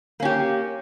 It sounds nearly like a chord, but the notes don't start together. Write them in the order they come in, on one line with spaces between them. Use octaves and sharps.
A#3 C#4 G4